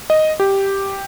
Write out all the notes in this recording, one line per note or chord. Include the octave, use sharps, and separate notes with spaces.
D#5
G4